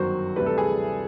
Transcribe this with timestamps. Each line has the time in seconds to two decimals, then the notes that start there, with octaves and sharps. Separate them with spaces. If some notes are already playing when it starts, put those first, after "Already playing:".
Already playing: G1 F#2 D#3 F#3 F#4 C5
0.36 D2 C3 E3 G3 B4
0.46 A4
0.58 G#4